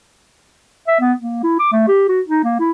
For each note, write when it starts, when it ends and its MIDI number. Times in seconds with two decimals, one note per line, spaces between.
0.88 0.96 76
1.00 1.13 59
1.21 1.39 58
1.43 1.57 64
1.59 1.68 86
1.72 1.83 57
1.88 2.04 67
2.08 2.20 66
2.28 2.44 63
2.44 2.58 58
2.59 2.71 64